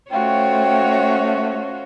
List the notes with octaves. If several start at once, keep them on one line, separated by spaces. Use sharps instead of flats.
A3 C#4 F4 F#4 C5 C#5 G5